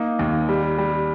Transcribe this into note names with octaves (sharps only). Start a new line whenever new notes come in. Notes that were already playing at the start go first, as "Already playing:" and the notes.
Already playing: A#3 D#4
D#2
G3
G3